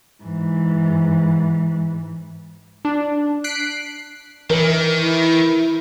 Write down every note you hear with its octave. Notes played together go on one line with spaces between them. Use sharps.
G#2 E3
D4
F#6 B6 C7 D7
D#3 E3 A#4 F#7
E4